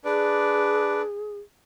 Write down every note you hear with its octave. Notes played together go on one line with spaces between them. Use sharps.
D4 G#4 B4 D5